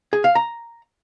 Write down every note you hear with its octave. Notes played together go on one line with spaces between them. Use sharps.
G#4
F5
A#5